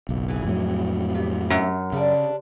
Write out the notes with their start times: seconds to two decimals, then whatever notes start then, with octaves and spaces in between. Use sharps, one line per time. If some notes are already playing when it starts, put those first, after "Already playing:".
0.09 F#1 B1
0.28 E3 G#4
0.44 F2 A2 F#3
1.14 C3
1.50 F#2
1.93 C#3 G3 D4